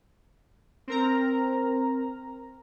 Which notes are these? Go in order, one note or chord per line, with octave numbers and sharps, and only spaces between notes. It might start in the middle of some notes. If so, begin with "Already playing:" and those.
C4 A#4 A#5